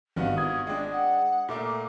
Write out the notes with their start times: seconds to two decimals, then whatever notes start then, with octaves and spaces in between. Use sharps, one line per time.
0.16 G#1 G2 B3 F#4 F5
0.37 F4 D#6 G#6
0.67 G#3 D4 G5
0.91 F#5
1.49 A#2 A3 A#3 D6